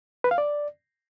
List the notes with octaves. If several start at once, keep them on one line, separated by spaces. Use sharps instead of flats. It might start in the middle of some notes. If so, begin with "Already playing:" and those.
B4
F5
D5